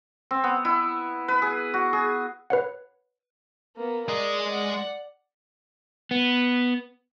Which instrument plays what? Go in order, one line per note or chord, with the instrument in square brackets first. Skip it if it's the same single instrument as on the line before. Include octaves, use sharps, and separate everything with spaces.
[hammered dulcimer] C4
B3
E4
B4
G#4
F#4
G#4
[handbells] B4 C#5 F#5
[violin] A#3 B3
[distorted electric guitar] G#3 D#5 [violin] D5
[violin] D5 F#5
[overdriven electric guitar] B3